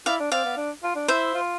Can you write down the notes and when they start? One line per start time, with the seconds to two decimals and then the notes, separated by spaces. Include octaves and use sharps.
0.06 E4 D5 F5
0.20 D4
0.32 C4 D5 F5
0.45 B3
0.57 D4
0.83 F4
0.95 D4
1.08 E4 C5 E5
1.34 F4